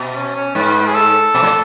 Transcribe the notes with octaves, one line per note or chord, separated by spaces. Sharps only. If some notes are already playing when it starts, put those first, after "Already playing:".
Already playing: B2
C#4
C#4
G#2 B4
G#4
A4
B2
A2